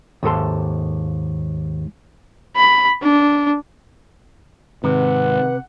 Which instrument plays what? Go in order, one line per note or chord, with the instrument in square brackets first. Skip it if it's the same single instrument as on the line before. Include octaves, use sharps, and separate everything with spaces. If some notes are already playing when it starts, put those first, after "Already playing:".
[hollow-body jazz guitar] D#2 G#2 A4 C6
[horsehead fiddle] B5
D4
[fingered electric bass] G#2 D#3 [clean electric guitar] C3 [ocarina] B4 [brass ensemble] F#5